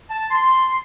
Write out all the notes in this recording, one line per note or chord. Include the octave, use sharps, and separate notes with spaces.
A5
C6